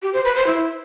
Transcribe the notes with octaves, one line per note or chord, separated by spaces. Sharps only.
G4
C5
B4
C5
E4